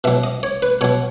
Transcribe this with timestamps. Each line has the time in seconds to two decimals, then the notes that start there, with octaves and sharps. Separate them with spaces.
0.04 B2 F#3 E5
0.24 D#5
0.43 C#5
0.62 B4
0.81 B2 F#3 C#5